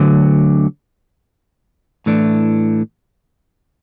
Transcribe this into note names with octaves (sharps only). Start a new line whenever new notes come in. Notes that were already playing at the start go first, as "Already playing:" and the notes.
Already playing: D2 D3 F#3
A2 E3 A3 D4